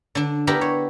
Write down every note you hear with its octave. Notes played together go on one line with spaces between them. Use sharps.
D3 D4
B3 D4 E4 G4 A#4 B4
C#5